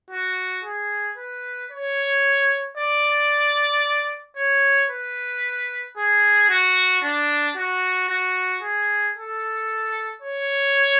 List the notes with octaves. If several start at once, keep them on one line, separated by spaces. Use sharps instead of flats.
F#4
G#4
B4
C#5
D5
C#5
B4
G#4
F#4
D4
F#4
F#4
G#4
A4
C#5